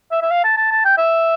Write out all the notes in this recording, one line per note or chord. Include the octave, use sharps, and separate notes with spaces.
E5
E5
F5
A5
A5
A5
G5
E5